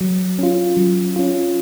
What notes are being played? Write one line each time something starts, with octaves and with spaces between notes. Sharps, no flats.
F#3
C#4 F4
F#3
C#4 F4